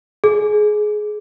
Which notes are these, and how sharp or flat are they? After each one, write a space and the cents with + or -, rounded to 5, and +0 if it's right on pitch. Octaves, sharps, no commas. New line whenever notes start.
G#4 +20